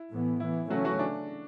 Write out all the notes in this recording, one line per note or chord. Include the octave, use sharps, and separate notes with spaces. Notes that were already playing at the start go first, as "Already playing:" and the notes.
Already playing: E4
A2 E3 B3
E3 B3 E4
C#3 E3 F#3 A3 C#4 F#4
F#3 F#4
D4